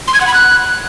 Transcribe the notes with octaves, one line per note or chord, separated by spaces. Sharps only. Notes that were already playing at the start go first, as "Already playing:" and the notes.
C6
G#6
F#5
B5
F#6